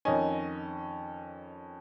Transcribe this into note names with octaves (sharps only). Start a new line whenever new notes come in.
F2 D#3 C#4 D#5 G#5